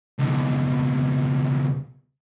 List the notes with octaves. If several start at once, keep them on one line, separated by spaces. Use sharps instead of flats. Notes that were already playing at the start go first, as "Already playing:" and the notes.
C#2 B2